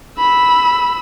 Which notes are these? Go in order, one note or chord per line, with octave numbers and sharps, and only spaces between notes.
B5 E6